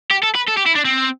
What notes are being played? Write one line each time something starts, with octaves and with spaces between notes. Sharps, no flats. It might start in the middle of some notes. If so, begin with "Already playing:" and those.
G4
A4
B4
A4
G4
E4
D4
C4